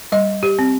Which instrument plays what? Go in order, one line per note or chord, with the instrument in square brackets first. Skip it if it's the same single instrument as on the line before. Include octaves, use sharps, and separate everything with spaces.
[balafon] G3 D#5
G4
C4